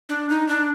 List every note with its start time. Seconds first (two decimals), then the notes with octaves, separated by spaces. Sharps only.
0.09 D4
0.30 D#4
0.48 D4